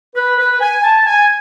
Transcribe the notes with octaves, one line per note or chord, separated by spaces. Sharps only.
B4
B4
G#5
A5
G#5